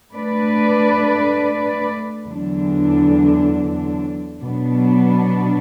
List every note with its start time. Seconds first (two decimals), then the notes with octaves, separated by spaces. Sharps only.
0.13 A3 D4 B4 D5
2.28 E2 D3 F#3 D4
4.41 B2 F#3 B3 D4